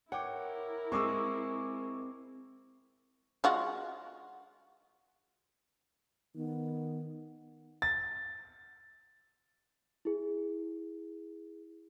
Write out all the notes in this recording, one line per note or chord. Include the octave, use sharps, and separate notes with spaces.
E4 A#4 C#5 F#5 G5 D6
G#3 C4 G#4 C#6 D6 E6
G#3 F4 F#4
D#3 B3
A6
E4 G#4